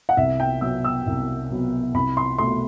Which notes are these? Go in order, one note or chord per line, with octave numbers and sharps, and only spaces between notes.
F#5
C2 E5
G5
B2 F#3 B3 E6
E6
C2
B2 F#3 B3
C2 B5
C6
B2 A3 C6